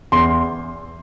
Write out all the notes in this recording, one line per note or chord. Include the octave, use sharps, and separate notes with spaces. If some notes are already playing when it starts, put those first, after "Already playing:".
E2 C6